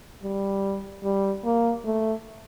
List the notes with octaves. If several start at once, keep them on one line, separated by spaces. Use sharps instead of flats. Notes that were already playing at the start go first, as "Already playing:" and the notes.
G3
G3
A#3
A3